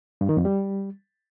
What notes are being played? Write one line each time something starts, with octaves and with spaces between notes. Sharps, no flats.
G2
D#3
F2
G3